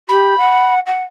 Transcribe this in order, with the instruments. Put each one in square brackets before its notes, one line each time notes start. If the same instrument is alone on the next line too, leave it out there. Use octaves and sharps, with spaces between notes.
[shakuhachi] G4 [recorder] B5
[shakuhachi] F#5
F#5